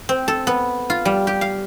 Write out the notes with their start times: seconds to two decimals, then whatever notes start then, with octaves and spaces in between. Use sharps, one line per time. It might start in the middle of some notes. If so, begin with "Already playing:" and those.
0.09 C4
0.28 A4
0.47 B3
0.90 F4
1.05 G3
1.27 G4
1.41 F5